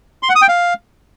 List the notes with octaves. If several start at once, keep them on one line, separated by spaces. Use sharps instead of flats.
C6
F#5
D#6
G5
F5